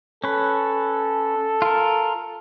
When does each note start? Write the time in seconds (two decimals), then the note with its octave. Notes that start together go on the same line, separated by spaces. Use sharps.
0.24 C#4 A4 B4
1.62 F4 A#4